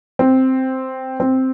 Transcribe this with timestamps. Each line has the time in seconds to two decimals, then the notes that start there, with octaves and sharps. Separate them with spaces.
0.19 C4
1.20 C4